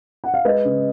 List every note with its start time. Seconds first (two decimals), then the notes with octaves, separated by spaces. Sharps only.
0.24 F#5
0.34 F5
0.45 G#3 B4 D#5
0.65 C#3